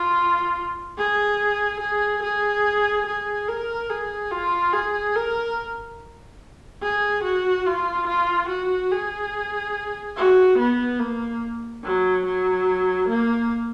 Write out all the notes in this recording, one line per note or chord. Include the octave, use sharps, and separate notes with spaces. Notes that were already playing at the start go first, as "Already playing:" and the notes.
Already playing: F4
G#4
G#4
G#4
G#4
A#4
G#4
F4
G#4
A#4
G#4
F#4
F4
F4
F#4
G#4
F#4
B3
A#3
F#3
F#3
A#3